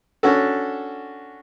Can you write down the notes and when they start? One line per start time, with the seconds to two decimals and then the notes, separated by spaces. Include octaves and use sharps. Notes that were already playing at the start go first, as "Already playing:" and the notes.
0.23 C#4 D4 F#4 A4